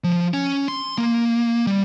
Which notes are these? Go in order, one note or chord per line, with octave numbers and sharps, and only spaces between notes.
F3
C#4
C6
A#3
G3